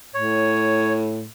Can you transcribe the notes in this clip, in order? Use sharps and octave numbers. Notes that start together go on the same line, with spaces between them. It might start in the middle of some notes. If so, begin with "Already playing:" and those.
A2 C#5